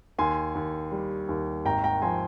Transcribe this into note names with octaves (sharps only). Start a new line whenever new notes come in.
D#2 G#5 C6
D#2
G3
D#2
G#1 G5 A#5
G5 A#5
F3 G#5 C6